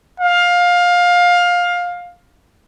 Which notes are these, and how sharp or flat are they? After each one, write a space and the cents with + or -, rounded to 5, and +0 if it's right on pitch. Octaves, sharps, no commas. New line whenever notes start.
F5 +20